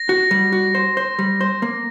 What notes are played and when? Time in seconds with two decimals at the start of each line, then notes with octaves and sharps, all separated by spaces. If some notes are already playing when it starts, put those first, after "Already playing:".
Already playing: A#6
0.09 F#4
0.31 G3
0.52 F#4
0.75 C5
0.97 C5
1.19 G3
1.41 C5
1.62 A#3